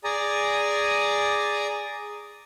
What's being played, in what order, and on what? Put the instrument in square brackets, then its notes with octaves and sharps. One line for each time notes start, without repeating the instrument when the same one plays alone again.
[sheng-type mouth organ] G#4 D5 G#5 A#5